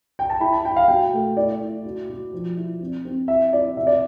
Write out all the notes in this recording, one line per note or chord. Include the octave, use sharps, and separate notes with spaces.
G5
A5
E4 B5
A5
E4 G5
F5
B2 G5
A3
E4 D5
E4
B2
B2
F3
E4
C4
C4
E4 E5
E4 D5
C3 E5
D5